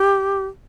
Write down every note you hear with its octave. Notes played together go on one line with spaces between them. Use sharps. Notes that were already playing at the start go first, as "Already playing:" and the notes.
Already playing: G4